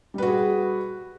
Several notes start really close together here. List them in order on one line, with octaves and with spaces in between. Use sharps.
G3 B4 F#4 G#4